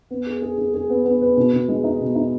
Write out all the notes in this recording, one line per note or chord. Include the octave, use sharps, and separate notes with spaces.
B3
G#4
G#4
G#4
G#4
B3
B3
B4
B2
B2
G#3
D#4
B2
D#4